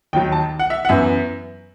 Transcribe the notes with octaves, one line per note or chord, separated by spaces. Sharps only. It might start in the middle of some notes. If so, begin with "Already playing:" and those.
D#2 D#3 F#3 G5
A5
F#5
E5
F#5
F#2 E3 B3 E5